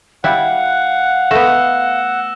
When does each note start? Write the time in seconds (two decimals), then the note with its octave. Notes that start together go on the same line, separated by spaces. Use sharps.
0.24 G3 E4 F5 F#5 F#6
1.31 A3 B3 E6 A#6 E7